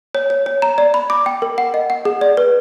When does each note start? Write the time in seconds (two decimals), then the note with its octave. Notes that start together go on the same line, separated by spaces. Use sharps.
0.15 C#5
0.30 C#5
0.46 C#5
0.62 A#5
0.78 D5
0.94 B5
1.10 D6
1.26 G5
1.42 A#4
1.58 F#5
1.74 D#5
1.90 F#5
2.05 G#4
2.21 D5
2.37 B4